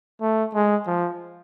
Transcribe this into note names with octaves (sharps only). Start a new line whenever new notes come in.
A3
G#3
F3